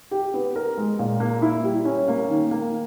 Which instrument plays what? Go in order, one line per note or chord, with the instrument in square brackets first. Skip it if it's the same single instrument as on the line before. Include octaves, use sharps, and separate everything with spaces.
[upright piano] G4
B3
A#4
G#3
A#2
A#3
E4
G3
C#4
A#3
D#3
A#3